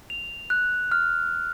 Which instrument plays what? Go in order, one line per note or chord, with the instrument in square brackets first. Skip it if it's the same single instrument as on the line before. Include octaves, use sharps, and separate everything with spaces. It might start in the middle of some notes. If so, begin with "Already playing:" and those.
[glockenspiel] F7
F#6
F6